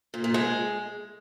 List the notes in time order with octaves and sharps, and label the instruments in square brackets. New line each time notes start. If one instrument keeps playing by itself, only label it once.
[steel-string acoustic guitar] A#2
A#2
G#3